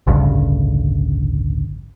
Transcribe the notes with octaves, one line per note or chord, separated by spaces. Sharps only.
A1 D2 G2 C#3